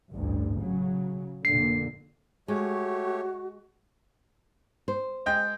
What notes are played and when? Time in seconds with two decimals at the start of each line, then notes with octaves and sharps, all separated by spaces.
0.12 A1 D2 G2
0.58 C#3 F#3
1.45 F1 A#2 D3 C7
2.48 G#3 A3 F#4 G4 C#5
4.88 C5
5.26 G#3 G5